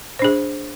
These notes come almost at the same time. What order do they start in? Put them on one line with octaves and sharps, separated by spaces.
C5 D4 G#4